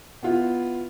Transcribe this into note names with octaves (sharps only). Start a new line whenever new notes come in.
B3 E4 F4